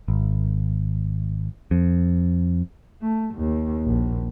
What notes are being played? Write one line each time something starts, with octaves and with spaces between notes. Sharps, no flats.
G#1
F2
A3
D#2
A#1